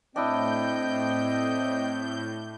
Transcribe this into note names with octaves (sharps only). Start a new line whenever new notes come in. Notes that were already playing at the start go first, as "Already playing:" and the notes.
A2 C4 D4 E4 D#5 G5 G6